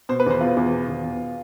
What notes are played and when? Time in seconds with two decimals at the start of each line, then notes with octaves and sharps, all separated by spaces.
0.09 B2 C5
0.20 B4
0.26 E2 C5
0.41 B2 F4
0.57 E2
0.72 B2
0.89 E2
1.05 B2